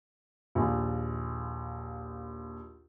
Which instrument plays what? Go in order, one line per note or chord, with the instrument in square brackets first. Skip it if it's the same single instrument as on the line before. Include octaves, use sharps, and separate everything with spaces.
[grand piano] A#1 D#2